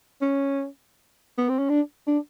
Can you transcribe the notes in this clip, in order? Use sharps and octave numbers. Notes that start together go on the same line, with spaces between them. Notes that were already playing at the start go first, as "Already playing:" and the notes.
C#4
B3
C4
C#4
D4
D4